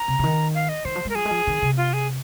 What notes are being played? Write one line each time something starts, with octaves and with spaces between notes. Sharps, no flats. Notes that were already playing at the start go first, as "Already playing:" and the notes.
Already playing: A#5
C3
C3
D#3
F5
D#5
D#3 C5
F3
G#3 A#4
F3 G#4
G#3
F3
D#3
C3
F4
G#4